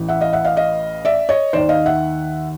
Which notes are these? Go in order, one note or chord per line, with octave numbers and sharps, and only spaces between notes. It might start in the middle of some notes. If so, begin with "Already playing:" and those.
Already playing: A1 A2 E3
E5 F#5
D#5 F5
E5 F#5
D#5 F5
D#5 F5
D5 E5
C#5 D#5
D#2 D#3 C5 D5
D#5 F5
E5 F#5